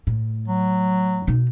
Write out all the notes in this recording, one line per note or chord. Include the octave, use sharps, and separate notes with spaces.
A2
F#3
B2 D#4